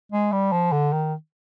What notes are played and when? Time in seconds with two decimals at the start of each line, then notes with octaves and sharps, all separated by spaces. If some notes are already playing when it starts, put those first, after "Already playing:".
0.12 G#3
0.32 G3
0.52 F3
0.72 D3
0.93 D#3